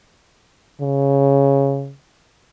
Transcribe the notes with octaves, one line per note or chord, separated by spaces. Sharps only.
C#3